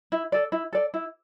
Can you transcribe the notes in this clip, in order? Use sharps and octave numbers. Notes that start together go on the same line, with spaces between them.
E4
A4 D5
E4
A4 D5
E4